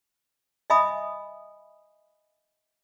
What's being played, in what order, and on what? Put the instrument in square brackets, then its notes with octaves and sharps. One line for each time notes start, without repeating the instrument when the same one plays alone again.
[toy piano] D#5 E5 G#5 B5 D#6